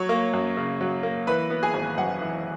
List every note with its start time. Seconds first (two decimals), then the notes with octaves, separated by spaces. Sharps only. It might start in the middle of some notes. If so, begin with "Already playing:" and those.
Already playing: F#3 C#5 C#6
0.09 A#3
0.33 F#2
0.57 C#3
0.81 F#3
1.03 A#3
1.27 E3 B4 B5
1.50 B3
1.63 G#4 G#5
1.74 G#1
1.98 F#2 F#5
2.21 E3